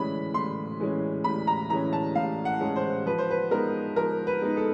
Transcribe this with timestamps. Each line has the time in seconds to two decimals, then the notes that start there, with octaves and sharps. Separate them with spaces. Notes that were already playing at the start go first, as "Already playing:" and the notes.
Already playing: A2 E3 G#3 C#4 B5
0.34 A2 C6
0.80 E3 G#3 C#4
1.24 A2 B5
1.47 A#5
1.70 E3 G#3 C#4 A#5
1.93 A5
2.15 A2 F5
2.45 F#5
2.61 E3 G#3 C#4
2.76 C5
3.06 F3 B4
3.18 C5
3.30 B4
3.51 G#3 B3 D#4 A#4
3.96 F3 A#4
4.27 B4
4.42 G#3 B3 D#4
4.57 A4